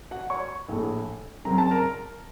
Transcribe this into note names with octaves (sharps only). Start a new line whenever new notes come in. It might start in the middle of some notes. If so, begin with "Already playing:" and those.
F#4 F#5
C#5 C#6
A#1 A2 A3
F#2 C#3 F#3 C4 A#5
A5
A#4 A#5